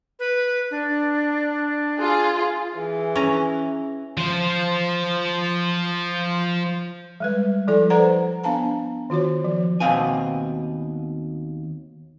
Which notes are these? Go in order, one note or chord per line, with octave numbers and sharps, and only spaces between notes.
B4
D4
F4 G#4
E3 G#4
C#4 A#5
F3 C5
G3 G#3 B4
F3 E4 A4 D5
A4 B4 C5 D5 F#5 A#5
B3 D4 F5 A5 A#5
D#3 F4 F#4 C#5
F3
D#2 B2 B3 C4 F5 G#5